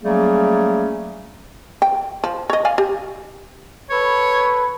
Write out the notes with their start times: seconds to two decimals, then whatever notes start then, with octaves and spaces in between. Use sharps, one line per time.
0.02 F#3 G3 A3 A#3 C#4 G#4
1.82 G5
2.24 F3
2.50 C#5 D#5
2.65 D5 F5 G#5
2.78 G4
3.90 A4 B4 C#5